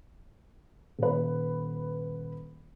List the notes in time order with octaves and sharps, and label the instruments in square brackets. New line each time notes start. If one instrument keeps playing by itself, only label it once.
[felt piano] D#1 B4